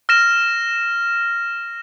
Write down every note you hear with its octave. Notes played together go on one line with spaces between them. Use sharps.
F6 A#6 E7